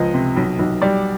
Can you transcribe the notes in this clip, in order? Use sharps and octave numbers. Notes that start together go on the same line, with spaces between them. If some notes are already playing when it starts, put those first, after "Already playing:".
Already playing: C#2 F3 D#5
C3
B1
B1
G3 D5